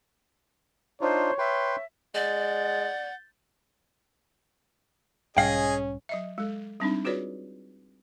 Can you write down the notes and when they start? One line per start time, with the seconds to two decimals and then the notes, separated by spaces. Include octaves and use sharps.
1.01 D4 D#4 F4 C5 C#5
1.38 B4 E5 G5 C6
2.15 G#3 D5 F#5 G6 A6
5.37 B1 G#2 G3 C#4 G#4 D#5 F5 G5
6.09 F#3 D#5 E5
6.38 G#3 A4
6.80 G3 C4 D4 D#4
7.05 F4 F#4 G#4 B4 C#5 D5